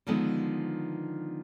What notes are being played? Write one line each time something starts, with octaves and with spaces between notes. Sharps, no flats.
D3 D#3 F3 G#3 B3